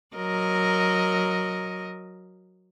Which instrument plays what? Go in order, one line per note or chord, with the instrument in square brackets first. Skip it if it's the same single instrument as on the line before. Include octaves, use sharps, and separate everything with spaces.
[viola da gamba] F#3 A#4 D#5